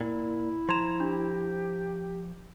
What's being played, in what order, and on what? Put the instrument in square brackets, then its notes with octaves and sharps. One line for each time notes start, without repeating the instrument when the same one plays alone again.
[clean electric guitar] A#2 [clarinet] E4
[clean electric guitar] F3 A#5 [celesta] C6 G#6 E7
[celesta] D4 [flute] G4